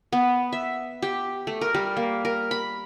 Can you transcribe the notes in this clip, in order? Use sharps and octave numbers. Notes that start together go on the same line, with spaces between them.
B3
E5
G4
A3
A#4
G3
A#3
A#4
B5